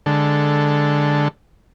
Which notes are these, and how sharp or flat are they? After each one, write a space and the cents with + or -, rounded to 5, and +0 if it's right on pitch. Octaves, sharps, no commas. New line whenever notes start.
D3 +0 G#3 +0 A4 +0